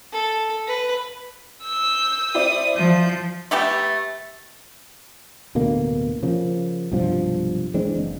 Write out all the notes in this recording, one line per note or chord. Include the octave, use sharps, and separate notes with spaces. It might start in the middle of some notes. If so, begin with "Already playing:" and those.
A4
B4
E6 G6
C4 E4 D5 D#6
F3 G6
A3 B3 G4 A4
D1 B2 D3 A#3
C#3 F3 A#3
B1 G2 C3 F3
E3 G#3 C4 D4
F#1